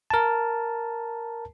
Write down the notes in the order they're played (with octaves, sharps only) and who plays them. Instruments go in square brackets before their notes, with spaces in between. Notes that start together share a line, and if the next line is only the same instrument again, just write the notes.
[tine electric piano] A#4 A5